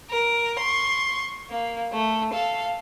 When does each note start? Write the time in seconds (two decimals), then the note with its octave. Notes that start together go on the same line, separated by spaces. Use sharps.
0.10 A#4
0.60 C6 C#6
1.50 A#3
1.93 A3
2.33 A4 F5